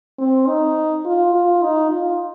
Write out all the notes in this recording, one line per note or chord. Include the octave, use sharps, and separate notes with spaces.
C4
D#4
F4
F4
D#4
F4